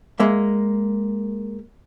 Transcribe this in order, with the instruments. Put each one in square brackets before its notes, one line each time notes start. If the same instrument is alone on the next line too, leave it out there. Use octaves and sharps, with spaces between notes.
[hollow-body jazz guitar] G#3 A#3 E5